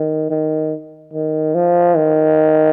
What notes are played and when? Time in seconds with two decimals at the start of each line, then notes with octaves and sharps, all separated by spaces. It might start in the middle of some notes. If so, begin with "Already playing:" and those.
Already playing: D#3
0.30 D#3
1.13 D#3
1.55 F3
1.97 D#3